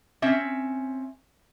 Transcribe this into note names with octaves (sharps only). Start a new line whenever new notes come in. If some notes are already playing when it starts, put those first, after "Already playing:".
C4 C#4 E5